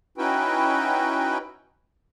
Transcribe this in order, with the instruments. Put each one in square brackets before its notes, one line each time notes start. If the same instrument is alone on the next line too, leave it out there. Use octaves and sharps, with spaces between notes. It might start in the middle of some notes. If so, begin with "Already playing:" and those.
[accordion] C#4 D#4 E4 F#4 B4 G5